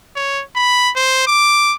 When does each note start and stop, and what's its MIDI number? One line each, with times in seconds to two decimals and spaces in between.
0.16 0.43 73
0.56 0.91 83
0.96 1.25 72
1.27 1.75 86